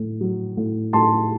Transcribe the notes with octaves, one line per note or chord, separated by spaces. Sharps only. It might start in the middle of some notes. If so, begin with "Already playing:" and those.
Already playing: A2
F#3
A2
A2 A5 C6